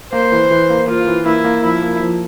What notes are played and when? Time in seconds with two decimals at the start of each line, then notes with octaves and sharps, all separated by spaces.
0.13 A#3 C5
0.32 E3
0.51 E3
0.70 A#3
0.88 A#3 F4
1.07 E3
1.25 A#3 E4
1.44 A#3
1.63 F3 E4
1.82 A#3
2.01 F3